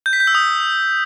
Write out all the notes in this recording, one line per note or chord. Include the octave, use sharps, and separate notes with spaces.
G6
B6
G6
E6
D#6